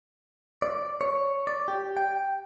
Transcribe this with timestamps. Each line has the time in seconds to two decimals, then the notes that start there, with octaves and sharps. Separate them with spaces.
0.62 D5
1.01 C#5
1.47 D5
1.68 G4
1.97 G5